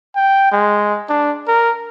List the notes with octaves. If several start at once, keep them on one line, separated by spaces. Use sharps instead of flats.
G5
G#3
D4
A#4